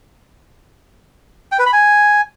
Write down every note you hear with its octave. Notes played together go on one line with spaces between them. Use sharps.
G5
B4
B5
G#5